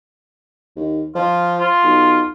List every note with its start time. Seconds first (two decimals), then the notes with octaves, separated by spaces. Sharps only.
0.76 D#2
1.15 F3 F4
1.60 F4
1.83 B1